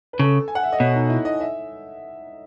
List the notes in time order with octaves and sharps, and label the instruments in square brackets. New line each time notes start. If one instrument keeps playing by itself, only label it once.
[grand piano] B4
[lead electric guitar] C#3 [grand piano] A4
[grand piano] G#5
F#5
E5
D#5
[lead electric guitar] B2 [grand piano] C#5
[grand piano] D#4
E4
D#5
E5